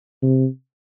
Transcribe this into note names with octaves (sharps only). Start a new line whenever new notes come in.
C3